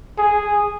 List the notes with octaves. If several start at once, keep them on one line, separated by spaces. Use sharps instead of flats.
G#4